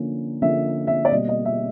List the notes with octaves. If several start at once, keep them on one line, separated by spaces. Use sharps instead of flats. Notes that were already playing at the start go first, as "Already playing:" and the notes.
Already playing: D3 F3 A#3 C#4
D3 F3 A#3 C#4 E5
E5
D5
B2 G3 A#3 D#5
D#5
E5